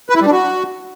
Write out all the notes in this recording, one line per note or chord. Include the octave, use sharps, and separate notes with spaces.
B4
E4
G3
D4
F#4